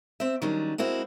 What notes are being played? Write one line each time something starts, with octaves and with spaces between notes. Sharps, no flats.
C4 E5
D#3 F#3 G3 C#4 D4
G#3 A#3 C4 E4 F#4